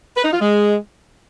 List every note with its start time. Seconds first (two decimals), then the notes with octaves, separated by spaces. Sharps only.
0.15 B4
0.24 D#4
0.32 F4
0.40 G#3